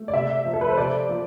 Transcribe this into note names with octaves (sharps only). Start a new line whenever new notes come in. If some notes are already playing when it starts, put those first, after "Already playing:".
Already playing: A3
D5
C3 E5
F3
A4
B4
C5
C3 D5
F3